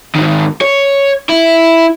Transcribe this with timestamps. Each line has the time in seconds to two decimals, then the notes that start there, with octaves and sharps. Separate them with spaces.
0.16 G#2 D#3
0.62 C#5
1.29 E4